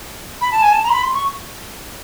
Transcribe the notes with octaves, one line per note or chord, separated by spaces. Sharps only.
B5
A5
G#5
A5
A#5
C6
B5
C6
C#6